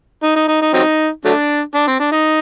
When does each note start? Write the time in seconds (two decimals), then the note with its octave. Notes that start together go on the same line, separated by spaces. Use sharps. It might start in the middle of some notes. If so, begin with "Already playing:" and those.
0.23 D#4
0.36 D#4
0.48 D#4
0.62 D#4
0.73 F#3 C4 D#4
1.25 F#3 A3 D4
1.75 D4
1.87 C4
2.00 D4
2.12 D#4